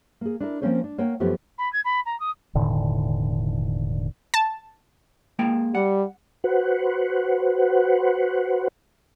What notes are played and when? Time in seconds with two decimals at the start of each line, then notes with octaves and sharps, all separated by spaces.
0.21 A#3 G#4
0.40 D4 E4 A#4
0.62 F3 A#3 C4 C#4 C5 C#5
0.84 D4
0.98 A#3 C#5 F#5 G5
1.20 F#2 F3 A3 B3 G4
1.58 B5
1.73 G#6
1.85 B5
2.06 A#5
2.20 D#6
2.55 E1 A2 D3 D#3
4.34 A5
5.39 G#3 A#3 G5
5.75 G3 F#5
6.44 F#4 B4 C5 F#5